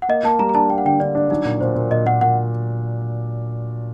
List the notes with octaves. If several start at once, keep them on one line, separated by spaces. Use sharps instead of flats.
F#5
A#3 D#5
A#3 A5
G3 A#5
A#5
D4 A5
A#3 G5
F#5
D3 G5
D3 D5
D4
F#3 D#4
A#2
A#2 C5
A#2
A#2 D#5
A#2 F#5
A#2 F#5